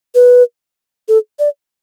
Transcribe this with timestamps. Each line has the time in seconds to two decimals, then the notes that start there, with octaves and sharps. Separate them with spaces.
0.15 B4
1.08 A4
1.39 D5